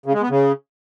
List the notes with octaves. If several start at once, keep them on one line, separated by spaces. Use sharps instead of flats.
C#3
G#3
B3
C#3